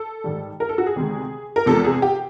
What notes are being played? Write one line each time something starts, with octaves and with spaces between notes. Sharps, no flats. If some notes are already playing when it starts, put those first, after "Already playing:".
Already playing: A4
G#2 D#3 G3
A#4
A4
F#4
G#4
D2 C3 D#3 G#3
A#4
E2 C3 F3 G#3 A4
G#4
G4